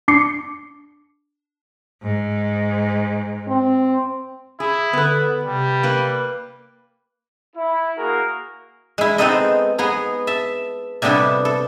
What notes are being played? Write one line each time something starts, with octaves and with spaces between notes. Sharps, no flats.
D4 D6 C7 C#7
G#2
C4
E4 G#4
D3 B3 B4
C3 G3
A#3 B4
E4
A#3 F#4 G#4 A#4
G#3 E4
G#3 B3 C4 D#4 A4 D#5
B3 G#4 A#5
E5 A5
C3 G3 B3 D4 E4 A4
A4